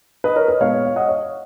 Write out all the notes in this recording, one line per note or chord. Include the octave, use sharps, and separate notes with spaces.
B4 D#5
A#4 C#5
B4 D#5
A#2 G#3 B3 C#5 F5
F5
D#5 F#5
C#5 F5